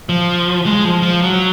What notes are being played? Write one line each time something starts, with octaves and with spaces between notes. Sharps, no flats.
F3
G#3
F3
F3
F#3